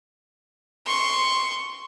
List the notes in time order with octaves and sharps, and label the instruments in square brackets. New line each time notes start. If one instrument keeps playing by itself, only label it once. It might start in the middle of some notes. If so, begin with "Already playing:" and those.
[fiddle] C6 C#6